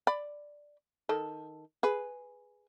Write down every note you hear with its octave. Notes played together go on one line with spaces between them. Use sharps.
D5 B5
D#3 A4
G#4 B4